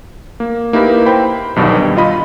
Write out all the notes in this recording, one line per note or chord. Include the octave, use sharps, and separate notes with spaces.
A#3
A#3 D#4 E4 G4 A#4 B4
C5 G5 B5
B1 G2 B2 D3 D#3
G3
F4 D#5 B5